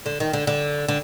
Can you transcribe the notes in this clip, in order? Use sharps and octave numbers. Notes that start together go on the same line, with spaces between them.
D3
D#3
D3
D3
D3